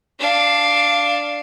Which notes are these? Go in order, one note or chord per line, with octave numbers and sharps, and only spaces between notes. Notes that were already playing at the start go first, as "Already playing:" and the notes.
D4 F5